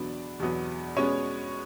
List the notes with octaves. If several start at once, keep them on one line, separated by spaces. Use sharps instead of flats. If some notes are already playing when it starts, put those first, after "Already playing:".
Already playing: E2 B2 F#3 B3 D4 D5
E2 B2 F#3 B3
B2 G#3 B3 C#4 C#5